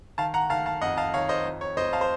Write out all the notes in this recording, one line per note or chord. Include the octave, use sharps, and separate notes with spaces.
D#3 F5 A5
F#5 A#5
D#3 F5 A5
F5 A5
F2 D#5 F#5
F5 A5
D#3 C#5 F5
C5 D#5
F2
C#5
F2 C5 D#5
F5 A5
C5